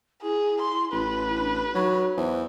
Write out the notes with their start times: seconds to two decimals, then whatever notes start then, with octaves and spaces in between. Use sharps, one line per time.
0.22 E4 G#4
0.62 C6
0.92 A1 B4
1.38 D4
1.74 F#3 D#4
2.17 E2 C5